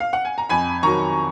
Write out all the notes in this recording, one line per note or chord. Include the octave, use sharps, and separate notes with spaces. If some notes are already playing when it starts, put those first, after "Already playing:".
F5
F#5
G#5
A#5
F2 G#5 B5
D#3 F#3 A#5 C#6